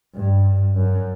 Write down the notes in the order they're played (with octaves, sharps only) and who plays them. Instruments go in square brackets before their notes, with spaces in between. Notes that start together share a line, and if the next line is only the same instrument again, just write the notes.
[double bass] G2
F#2